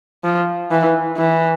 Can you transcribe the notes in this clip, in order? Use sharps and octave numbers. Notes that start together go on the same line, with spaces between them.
F3
E3
E3